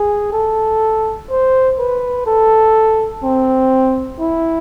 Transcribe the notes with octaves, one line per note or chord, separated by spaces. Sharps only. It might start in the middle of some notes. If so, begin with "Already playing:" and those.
Already playing: G#4
A4
C5
B4
A4
C4
E4